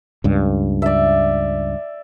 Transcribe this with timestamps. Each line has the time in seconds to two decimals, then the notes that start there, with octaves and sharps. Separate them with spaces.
0.24 C#2 G2
0.82 D5 E5